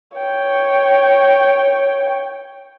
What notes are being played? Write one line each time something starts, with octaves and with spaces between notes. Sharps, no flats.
C#5 G5